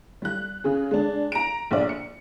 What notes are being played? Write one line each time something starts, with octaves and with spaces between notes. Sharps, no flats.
G3 F#6
C#3 G#4
G#3 D4
A#5 D7
A#1 D5
C#7